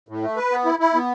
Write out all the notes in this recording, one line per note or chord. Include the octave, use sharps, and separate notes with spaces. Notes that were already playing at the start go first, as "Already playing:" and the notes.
A2
A3
B4
B3
E4
E4
B3